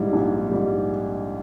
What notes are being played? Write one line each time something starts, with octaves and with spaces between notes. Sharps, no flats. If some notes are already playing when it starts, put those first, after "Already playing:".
Already playing: A#1 G#2 G3 E4
A#1
G#2 G3